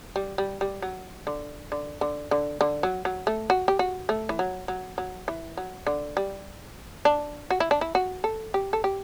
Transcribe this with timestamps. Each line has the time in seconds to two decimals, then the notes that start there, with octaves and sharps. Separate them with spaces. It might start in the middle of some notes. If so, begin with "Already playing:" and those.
0.16 G3
0.38 G3
0.61 G3
0.82 F#3
1.27 D3
1.72 D3
2.01 D3
2.31 D3
2.61 D3
2.83 F#3
3.05 F#3
3.27 A3
3.50 F#4
3.68 G4
3.79 F#4
4.09 A3
4.29 E3
4.39 F#3
4.68 F#3
4.98 F#3
5.28 E3
5.57 F#3
5.87 D3
6.17 G3
7.05 D4
7.50 F#4
7.60 E4
7.71 D4
7.81 E4
7.95 F#4
8.24 A4
8.54 G4
8.73 A4
8.84 G4